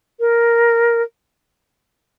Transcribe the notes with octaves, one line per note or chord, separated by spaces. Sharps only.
A#4